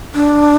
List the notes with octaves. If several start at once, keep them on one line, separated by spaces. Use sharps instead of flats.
D4